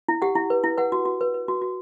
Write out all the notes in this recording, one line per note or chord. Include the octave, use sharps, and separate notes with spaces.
E4
G4 F#5
E4
B4
E4
B4 F#5
F#4
F#4
B4
B4
F#4
F#4